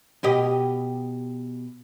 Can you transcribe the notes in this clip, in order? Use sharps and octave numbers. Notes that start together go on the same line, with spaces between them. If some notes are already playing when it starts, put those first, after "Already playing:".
B2 G4 D#5